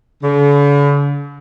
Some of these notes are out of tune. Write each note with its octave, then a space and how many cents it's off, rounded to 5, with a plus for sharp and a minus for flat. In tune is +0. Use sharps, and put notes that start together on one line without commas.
D3 -45